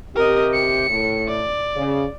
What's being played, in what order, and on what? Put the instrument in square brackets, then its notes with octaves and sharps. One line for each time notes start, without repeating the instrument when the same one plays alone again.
[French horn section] C3 G4 [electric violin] A#4 D#5
[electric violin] C#7
[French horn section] A2
[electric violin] D5
[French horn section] C#3